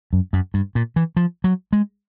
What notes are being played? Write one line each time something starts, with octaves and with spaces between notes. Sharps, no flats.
F#2
F#2
G2
A#2
E3
F3
F#3
G#3